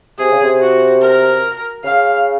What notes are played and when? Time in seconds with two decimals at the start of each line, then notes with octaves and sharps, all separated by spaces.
0.18 C3 G#4
0.31 C#3
0.43 C3
0.60 F#4
1.01 A#4
1.84 C#3 F5